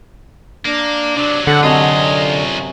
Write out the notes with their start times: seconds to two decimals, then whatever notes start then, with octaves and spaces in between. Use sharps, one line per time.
0.65 A#3 D4
1.16 C3 F#3 D4
1.47 D3 A4 F#5
1.63 F#2 C3 F#3 F4 C#5 D#5